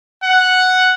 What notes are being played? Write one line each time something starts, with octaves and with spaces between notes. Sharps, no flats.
F#5